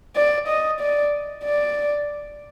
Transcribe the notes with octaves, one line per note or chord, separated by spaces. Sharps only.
D5
D#5
D5
D5